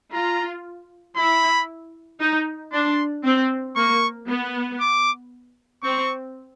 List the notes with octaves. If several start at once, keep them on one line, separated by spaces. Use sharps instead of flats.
F4 A#5
E4 B5
D#4
D4 C6
C4
A#3 C#6
B3
D6
C4 C#6